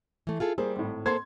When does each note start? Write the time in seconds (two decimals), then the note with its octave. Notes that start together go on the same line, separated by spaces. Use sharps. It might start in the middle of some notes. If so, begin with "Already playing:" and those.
0.27 E3 A3
0.40 F4 G#4 A4
0.58 G3 A#3 G#4 C5
0.76 G#1 A2
1.06 A#3 A4 C5 C6 G#6